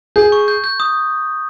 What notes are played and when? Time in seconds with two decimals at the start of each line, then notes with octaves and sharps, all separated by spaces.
0.16 G#4 G6
0.32 C#6
0.48 G6
0.64 G6
0.80 D#6